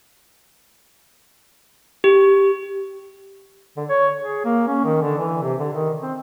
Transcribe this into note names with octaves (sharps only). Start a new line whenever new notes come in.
G4
D3
C#5
G#4
A#3
C#4
D#3
D3
E3
C3
D3
D#3
C4